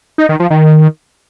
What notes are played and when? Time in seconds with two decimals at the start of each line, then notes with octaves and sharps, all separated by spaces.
0.18 D#4
0.29 D#3
0.40 F3
0.50 D#3